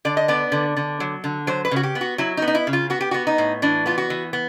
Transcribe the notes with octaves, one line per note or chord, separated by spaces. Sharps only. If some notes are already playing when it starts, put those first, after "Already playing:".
D3 D5
D#5
B3 D5
D3
D3
F#3
D3
F#3 C5
B4
C#3 F#4
G4
B3
F#4
F#3 E4
D#4
B3
D#4
E4
C#3
F4
B3 F#4
G4
B3 F#4
D#4
A2
E3 D4
B3 F4
F#4
E3
B3